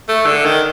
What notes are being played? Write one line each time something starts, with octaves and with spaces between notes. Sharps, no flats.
A3
D3
D#3